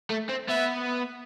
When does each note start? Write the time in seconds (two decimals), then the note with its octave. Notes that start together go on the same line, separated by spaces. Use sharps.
0.10 A3
0.30 C4
0.49 B3 E5